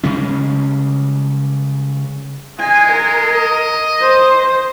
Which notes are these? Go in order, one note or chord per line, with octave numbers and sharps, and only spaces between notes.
C#3 G3 G#3 C#4
G#3 G#5
A#4
D#5
C5